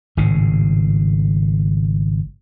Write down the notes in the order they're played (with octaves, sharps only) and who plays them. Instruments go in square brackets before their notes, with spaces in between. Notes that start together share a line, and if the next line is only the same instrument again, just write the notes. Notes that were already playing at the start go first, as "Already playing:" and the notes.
[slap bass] G#1 A2 C#3